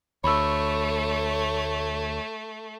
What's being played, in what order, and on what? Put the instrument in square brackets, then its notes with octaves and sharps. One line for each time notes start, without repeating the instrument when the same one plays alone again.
[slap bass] D2 [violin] A3 [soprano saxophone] C#5 [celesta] B5 E6